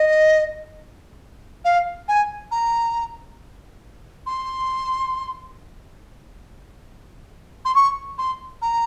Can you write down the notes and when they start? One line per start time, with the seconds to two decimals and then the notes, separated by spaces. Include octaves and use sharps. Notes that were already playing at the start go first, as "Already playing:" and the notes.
Already playing: D#5
1.65 F5
2.08 G#5
2.51 A#5
4.26 C6
7.65 C6
7.75 C#6
8.18 C6
8.62 A#5